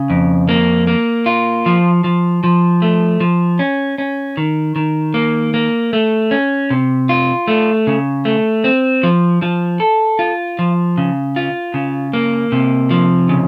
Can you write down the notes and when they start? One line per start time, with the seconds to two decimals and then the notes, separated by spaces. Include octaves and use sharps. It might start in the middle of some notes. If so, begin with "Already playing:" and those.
Already playing: C#3
0.10 F2
0.49 A#3
0.87 A#3
1.26 F4
1.66 F3
2.04 F3
2.44 F3
2.82 A3
3.20 F3
3.59 C#4
3.98 C#4
4.37 D#3
4.76 D#3
5.14 A#3
5.54 A#3
5.93 A3
6.31 C#4
6.70 C3
7.09 F4
7.48 A3
7.87 C#3
8.25 A3
8.64 C4
9.03 F3
9.42 F3
9.80 A4
10.19 F4
10.59 F3
10.98 C#3
11.36 F4
11.74 C#3
12.13 A#3
12.52 C3
12.91 F3
13.29 C#3